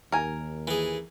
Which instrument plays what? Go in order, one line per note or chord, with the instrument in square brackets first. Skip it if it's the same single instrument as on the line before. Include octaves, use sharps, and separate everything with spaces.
[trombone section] D#2 [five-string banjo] A#4 G#5
[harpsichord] E3 G#4